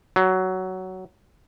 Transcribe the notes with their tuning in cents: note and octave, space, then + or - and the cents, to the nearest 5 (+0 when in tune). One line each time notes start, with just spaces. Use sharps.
F#3 +10